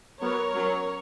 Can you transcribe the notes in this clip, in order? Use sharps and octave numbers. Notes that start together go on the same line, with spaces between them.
F#3 B3 A#4 C#5
F#3 C#4